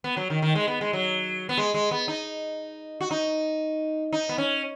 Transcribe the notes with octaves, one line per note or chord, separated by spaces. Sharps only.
B3
F#3
D#3
D#3
G#3
B3
G#3
F#3
B3
G#3
G#3
B3
D#4
F#4
D#4
D#4
B3
C#4